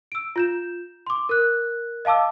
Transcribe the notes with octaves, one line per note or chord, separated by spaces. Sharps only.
E6 D7
F4 G6 E7
C6 D6
A#4 F#6
D#5 F5 A5 D6 E6